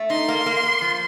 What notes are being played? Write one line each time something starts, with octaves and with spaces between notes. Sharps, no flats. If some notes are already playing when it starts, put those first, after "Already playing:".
Already playing: A3
D#4 C6
A#3
A#3
A#3
F3